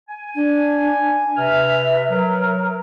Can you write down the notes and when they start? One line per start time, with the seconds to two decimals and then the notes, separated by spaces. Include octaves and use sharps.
0.09 G#5
0.35 D4
1.37 C3 B4 E5 F6
2.10 F#3 A#4